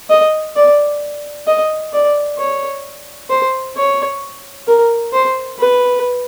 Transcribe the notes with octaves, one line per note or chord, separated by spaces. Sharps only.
D#5
D5
D#5
D5
C#5
C5
C#5
A#4
C5
B4